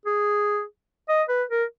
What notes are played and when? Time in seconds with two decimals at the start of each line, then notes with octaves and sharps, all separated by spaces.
0.06 G#4
1.09 D#5
1.29 B4
1.50 A#4